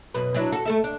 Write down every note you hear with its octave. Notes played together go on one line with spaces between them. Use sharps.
F#2 B2 B4
F#3 D4 E4
F#4 A4
A3 A4 E5
D4